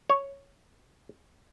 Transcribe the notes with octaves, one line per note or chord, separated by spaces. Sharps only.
C#5